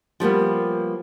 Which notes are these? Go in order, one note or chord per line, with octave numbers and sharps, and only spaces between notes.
F3 G3 A#3 B3